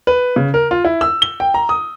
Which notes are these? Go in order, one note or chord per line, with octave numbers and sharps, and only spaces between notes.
B4
C#3
A#4
F4
E4
E6
G7
G5
A#5
D#6